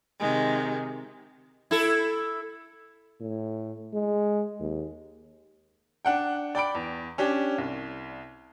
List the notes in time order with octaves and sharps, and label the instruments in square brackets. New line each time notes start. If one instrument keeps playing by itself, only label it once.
[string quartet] C3 D#3 G#3
[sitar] E4 A4
[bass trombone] A2
G#3
D#2
[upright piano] D4 F#5 G5
D5 G5 B5 D7
E2
C#4 D4 G4
C2